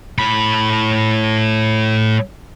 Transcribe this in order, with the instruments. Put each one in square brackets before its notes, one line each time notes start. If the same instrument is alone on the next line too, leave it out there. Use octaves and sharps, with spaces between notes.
[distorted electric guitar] A2 B5